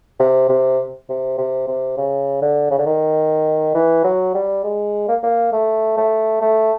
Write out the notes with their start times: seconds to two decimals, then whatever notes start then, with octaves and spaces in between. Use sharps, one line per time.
0.20 C3
0.49 C3
1.09 C3
1.38 C3
1.67 C3
1.97 C#3
2.42 D3
2.70 C#3
2.78 D3
2.86 D#3
3.74 E3
4.04 F#3
4.34 G3
4.64 G#3
5.08 A#3
5.23 A#3
5.52 A3
5.97 A3
6.41 A3